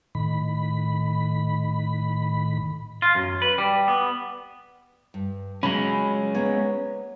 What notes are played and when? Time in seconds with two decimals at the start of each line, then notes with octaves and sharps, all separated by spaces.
0.15 A2 D#3 B5
3.02 F4
3.15 F#2
3.42 B4
3.58 G3
3.88 B3
5.14 G2
5.63 F#3 G#3 C#4 B5
6.35 A#3 B3 C#5